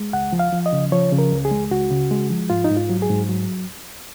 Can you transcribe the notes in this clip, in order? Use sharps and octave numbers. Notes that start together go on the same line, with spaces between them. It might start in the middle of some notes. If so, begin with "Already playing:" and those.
Already playing: G#3
C#2 F#5
F3
F5
F3
D#5
C#3
F3 C#5
C#3
A#4
C#2
G#4
G#3
C#2 F#4
C#3
G#3
F3
G#2 F4
D#4
G#2
F4
F#3
G#4
G#2
F#3